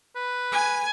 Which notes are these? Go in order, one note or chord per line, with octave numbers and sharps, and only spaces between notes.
B4
G#5